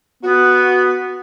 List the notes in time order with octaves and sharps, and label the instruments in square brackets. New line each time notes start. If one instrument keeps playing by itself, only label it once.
[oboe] B3 [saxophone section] F#4